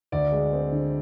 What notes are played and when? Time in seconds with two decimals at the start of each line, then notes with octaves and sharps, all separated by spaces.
0.12 D2 D5
0.32 G#3
0.53 C4
0.72 D3